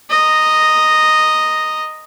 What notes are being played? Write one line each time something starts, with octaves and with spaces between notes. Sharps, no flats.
D#5 A#5